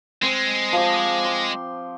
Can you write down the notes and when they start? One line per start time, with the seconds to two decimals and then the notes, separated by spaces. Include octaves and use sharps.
0.22 G#3 C4
0.73 F3 G4
1.24 C6